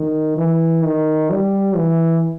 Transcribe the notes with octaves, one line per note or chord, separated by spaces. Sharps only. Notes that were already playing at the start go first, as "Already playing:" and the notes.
Already playing: D#3
E3
D#3
G3
E3